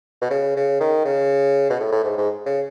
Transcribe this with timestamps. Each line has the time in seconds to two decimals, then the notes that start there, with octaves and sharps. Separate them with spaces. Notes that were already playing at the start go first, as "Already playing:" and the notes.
0.22 B2
0.30 C#3
0.56 C#3
0.80 D#3
1.05 C#3
1.70 B2
1.80 A2
1.92 A2
2.04 G#2
2.17 G#2
2.46 C#3